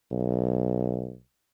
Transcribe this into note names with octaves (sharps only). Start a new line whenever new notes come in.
B1